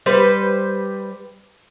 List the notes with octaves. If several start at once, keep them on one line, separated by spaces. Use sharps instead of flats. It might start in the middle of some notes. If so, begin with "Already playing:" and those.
G3 B4 C5